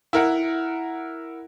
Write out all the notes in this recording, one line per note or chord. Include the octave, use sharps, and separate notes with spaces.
E4 A#4 F#5